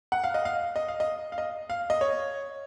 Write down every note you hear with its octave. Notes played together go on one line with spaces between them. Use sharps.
F#5
F5
D#5
F5
D#5
F5
D#5
F5
D#5
F5
D#5
C#5